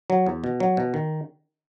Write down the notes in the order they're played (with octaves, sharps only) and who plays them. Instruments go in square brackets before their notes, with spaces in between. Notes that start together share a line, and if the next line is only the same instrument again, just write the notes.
[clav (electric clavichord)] F#3
E2
B2
F#3
B2
D#3